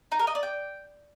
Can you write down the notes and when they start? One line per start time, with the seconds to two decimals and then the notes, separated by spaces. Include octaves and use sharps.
0.12 D#4
0.19 A#4
0.27 D#5
0.35 D5
0.43 G5